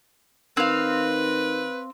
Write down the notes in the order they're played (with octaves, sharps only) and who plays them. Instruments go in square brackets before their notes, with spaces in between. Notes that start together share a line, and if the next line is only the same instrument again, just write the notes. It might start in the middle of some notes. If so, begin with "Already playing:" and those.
[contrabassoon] D#3 [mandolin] C4 F5 [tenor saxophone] B4